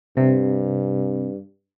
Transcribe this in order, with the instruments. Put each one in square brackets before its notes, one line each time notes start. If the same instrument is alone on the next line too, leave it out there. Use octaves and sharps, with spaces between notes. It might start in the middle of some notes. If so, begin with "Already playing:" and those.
[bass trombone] G2 [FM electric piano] C3